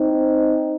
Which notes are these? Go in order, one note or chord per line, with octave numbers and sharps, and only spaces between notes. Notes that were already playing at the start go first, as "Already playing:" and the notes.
Already playing: C4 D#4